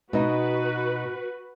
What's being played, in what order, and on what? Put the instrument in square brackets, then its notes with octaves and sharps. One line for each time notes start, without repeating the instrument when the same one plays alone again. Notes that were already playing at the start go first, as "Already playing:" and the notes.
[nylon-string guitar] B2 D#4 [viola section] F#4 B4